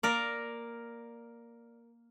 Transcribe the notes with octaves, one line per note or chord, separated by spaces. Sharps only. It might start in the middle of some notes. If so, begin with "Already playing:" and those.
A#3 A#4 D5